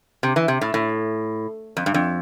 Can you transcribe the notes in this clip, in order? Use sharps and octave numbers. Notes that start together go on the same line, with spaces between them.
C3
E3
C3
A2
A2
F2
G2
F2